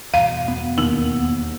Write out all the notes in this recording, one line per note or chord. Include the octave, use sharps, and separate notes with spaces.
E2 G2 B2 F5
B3
D#2 E6 F#7